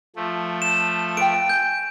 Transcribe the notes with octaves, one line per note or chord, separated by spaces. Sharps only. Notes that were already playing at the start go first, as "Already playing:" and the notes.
F3 A3
E7
B4 G5 D7
G#5 G6